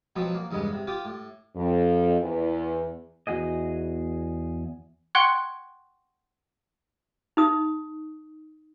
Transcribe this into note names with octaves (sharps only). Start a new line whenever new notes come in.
B2 F3 F#3 B3 C4
A#3
E2 G2 C#3 G#3 B3
C3
F4 G4 G5 D#6
A2
F2
E2
E2 F#4 G#4 D#5
F#5 G5 C6 C#6 F#6 G#6
D#4 D#6